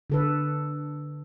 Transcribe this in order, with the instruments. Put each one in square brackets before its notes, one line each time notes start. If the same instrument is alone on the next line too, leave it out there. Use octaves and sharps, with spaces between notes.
[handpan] D3 A4 B4